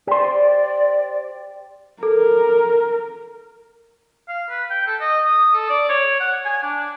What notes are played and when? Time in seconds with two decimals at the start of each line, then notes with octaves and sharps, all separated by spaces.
0.07 G4 C5 D5
2.03 A4 A#4
4.28 F5
4.50 B4
4.70 G5
4.87 A4
5.00 D#5
5.25 D#6
5.54 A4
5.69 D5
5.89 C#5
6.20 F#5
6.45 G#5
6.62 D4